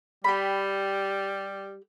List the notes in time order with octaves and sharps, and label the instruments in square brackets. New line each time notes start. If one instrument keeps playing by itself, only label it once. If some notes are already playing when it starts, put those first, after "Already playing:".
[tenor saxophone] G3 [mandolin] G4 B5